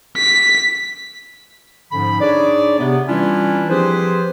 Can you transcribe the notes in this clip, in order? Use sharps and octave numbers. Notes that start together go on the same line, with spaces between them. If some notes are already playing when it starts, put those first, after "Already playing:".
B6
G#2 D3 F3 C#4 B5
D4 D#4 G#4 C#5 D5
C3 B3
E3 G3 C#4 D4 E4 F4
F3 C4 G4 G#4 B4 C5